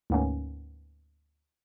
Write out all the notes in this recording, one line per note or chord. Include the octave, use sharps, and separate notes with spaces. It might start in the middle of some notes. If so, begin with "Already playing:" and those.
D2 G#2 A#3 B3 C#4